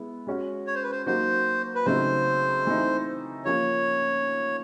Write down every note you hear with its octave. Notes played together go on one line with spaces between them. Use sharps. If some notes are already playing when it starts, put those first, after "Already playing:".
Already playing: G#3 B3 E4
G#3 C#4 F#4
C#5
C5
B4
C5
F#3 A#3 D#4 F#4 C5
B4
C#3 F#3 A3 C4 D#4 C5
E3 A3 C4 D#4
F3 A#3 C#4 C#5